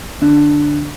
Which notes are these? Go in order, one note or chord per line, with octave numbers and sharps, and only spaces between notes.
D3